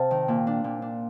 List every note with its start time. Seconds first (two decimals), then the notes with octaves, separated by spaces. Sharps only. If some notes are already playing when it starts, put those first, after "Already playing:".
Already playing: C3 F5 G5 A5
0.11 D#3
0.28 A#2
0.47 D4
0.64 A#2
0.82 D4